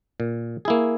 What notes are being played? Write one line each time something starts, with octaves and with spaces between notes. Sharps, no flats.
A#2
A#3 E4 G#4